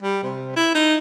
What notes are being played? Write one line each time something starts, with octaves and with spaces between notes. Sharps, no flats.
G3
C3
E4
D#4